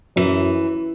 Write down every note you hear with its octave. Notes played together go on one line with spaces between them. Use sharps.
F#2 E3